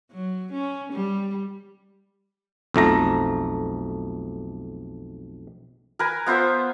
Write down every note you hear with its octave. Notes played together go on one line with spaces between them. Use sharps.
F#3
C#4
G3
B1 F2 A3 A#5
A#4 B4 G#5
B3 F4 C5 E5